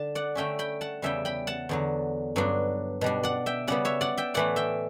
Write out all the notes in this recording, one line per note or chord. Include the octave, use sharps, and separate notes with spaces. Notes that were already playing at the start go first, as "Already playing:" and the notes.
Already playing: D3 D4 A5
D5 F#5
D3 A3 C#4 E5 G5
G5 B5
F#5 A5
E2 C#3 G3 E5 G5
G5 B5
F#5 A5
E2 D3 F#3
G2 F#3 B3 D4
B2 G3 D4
D5 F#5
E5 G5
C#3 G3 B3 D5 F#5
C#5 E5
D5 F#5
E5 G5
A2 E3 A3 D5 F#5
E5 G5